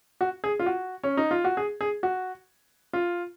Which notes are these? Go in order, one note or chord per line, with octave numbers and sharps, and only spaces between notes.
F#4
G#4
F4
F#4
C#4
D#4
F4
F#4
G#4
G#4
F#4
F4